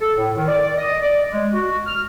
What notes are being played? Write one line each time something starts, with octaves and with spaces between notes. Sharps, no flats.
A4
A2
D#3
D5
D#5
D5
G#3
F#4
F6